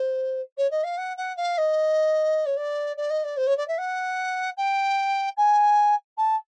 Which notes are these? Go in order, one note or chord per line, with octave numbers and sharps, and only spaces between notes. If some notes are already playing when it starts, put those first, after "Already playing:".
Already playing: C5
C#5
D#5
F5
F#5
F#5
F5
D#5
C#5
D5
D5
D#5
D5
C5
C#5
D5
E5
F#5
G5
G#5
A5